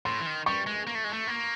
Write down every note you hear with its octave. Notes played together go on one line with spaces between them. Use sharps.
A2 C6
E3
D#3
G3 C#6
G#3
A#3
A3
G#3
A3
A#3